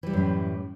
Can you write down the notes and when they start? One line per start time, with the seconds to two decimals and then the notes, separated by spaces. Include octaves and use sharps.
0.03 E3
0.06 G3
0.10 C3
0.13 F#2
0.17 A2